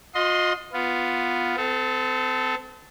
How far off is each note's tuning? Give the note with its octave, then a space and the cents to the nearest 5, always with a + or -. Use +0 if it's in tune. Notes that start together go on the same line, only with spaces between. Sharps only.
F4 +40 D#5 +0 C6 -5
B3 +0 F4 +0
C4 -35 A4 +0